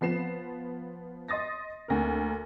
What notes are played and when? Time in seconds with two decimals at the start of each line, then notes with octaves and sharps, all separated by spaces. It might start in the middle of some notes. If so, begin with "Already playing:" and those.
0.01 F3 B3 C7 E7
1.28 D#5 C6 D#6 A6 A#6
1.88 D2 A#3 A#4